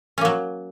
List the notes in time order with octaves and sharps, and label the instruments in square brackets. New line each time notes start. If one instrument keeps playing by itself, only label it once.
[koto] C#4
A#3
F#3